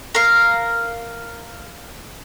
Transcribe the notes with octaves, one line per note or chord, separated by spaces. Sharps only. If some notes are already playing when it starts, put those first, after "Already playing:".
A#4 F5